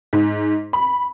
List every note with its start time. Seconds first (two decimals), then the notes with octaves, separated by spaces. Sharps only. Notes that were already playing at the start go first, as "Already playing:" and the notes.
0.13 G#2
0.73 B5